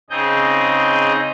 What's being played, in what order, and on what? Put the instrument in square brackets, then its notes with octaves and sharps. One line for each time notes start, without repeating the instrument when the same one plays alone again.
[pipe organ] C#3 C4 D#4 G#4 D#5 G6